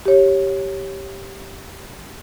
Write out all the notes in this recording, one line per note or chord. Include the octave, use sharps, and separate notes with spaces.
G4 C#5